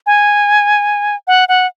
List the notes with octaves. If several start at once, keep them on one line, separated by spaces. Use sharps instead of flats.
G#5
F#5
F#5